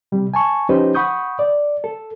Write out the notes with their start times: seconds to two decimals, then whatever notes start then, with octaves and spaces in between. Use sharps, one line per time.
0.12 C3 G3
0.34 G#5 A5 C#6
0.69 F3 C#4 D#4 G4 B4 C5
0.95 F#5 B5 C#6 D#6 G6
1.39 D5
1.84 A4